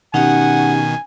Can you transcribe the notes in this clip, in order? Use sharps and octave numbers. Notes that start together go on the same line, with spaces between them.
B2 D#3 C#4 D#4 G4 F#5 G#5